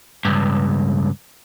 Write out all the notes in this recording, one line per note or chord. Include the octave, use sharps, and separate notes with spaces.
C#2 G2